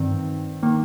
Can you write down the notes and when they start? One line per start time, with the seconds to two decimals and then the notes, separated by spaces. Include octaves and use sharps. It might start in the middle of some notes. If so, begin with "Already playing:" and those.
Already playing: G2 D#3 C4
0.63 D#3 A#3